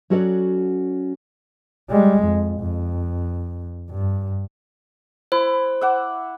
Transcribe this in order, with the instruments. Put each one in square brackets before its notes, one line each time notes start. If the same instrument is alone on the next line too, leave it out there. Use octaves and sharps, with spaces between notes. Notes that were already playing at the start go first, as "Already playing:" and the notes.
[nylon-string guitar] F#3 C#4 F#4 A4 C#5 D5
[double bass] G3 G#3
F2
F2
G2
[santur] E4 [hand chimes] C5
[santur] E5 F#5 D6